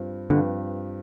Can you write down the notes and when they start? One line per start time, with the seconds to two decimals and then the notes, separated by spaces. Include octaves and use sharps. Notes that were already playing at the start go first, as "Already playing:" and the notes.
Already playing: G2 F3 C4
0.30 G2 D3 F3 C4 G4 B4